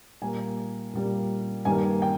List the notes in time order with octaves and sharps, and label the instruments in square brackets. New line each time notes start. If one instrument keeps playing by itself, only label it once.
[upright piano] A#2 G3 A#3 G#5
A#2 G3 A#3
G2 D#3 G3 A#3 G#5
G5